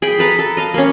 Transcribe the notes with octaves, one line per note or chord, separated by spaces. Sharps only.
G#4 G5 B5
A4 B4 A#5
A4
D#5 F5
A#3 C#4